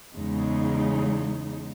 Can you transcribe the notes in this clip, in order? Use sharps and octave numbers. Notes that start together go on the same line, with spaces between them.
E2 C#3 G#3 D#4